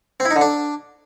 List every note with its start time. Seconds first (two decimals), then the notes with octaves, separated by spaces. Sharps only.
0.20 C4
0.25 E4
0.31 D#4
0.36 D3
0.41 D4